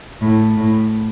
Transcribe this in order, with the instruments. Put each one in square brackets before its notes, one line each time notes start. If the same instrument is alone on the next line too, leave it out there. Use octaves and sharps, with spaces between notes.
[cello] A2
A2